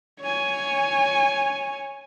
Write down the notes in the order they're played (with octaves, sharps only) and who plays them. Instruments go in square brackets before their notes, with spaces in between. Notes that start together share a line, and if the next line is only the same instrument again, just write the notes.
[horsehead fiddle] C#5 G#5